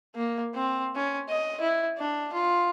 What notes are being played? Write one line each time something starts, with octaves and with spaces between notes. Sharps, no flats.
A#3
C4
C#4
D#5
E4
D4
F4